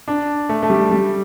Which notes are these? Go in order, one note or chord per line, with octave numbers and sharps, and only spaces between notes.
D4
A3
A3
G3
G3